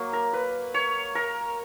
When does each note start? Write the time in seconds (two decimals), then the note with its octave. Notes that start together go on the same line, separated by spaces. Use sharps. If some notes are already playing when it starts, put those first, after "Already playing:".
Already playing: F#3 A#3
0.13 A#4
0.33 B4
0.74 C#5
1.15 A#4